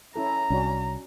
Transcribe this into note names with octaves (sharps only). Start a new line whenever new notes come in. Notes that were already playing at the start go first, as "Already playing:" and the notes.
C#4 E4 A4 A#5
C2 C#4 D4 F#4